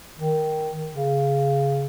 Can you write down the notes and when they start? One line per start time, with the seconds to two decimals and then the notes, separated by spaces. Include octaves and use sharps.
0.18 D#3
0.95 C#3